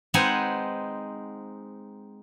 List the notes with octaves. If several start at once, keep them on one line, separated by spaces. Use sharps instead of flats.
G#3 C4 D#4 B4 F#5 G#5